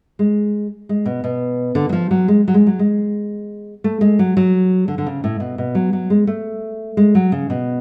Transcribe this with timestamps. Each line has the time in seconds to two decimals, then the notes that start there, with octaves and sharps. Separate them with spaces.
0.19 G#3
0.89 G#3
1.05 B2
1.24 B2
1.75 D3
1.89 F#3
1.93 F3
2.11 F#3
2.28 G#3
2.48 F#3
2.54 G#3
2.67 F#3
2.79 G#3
3.84 A3
4.01 G#3
4.19 F#3
4.37 F#3
4.88 D3
4.98 D3
5.06 C#3
5.24 A2
5.40 B2
5.58 B2
5.75 F#3
5.93 F#3
6.10 G#3
6.27 A3
6.97 G#3
7.15 F#3
7.32 C#3
7.50 B2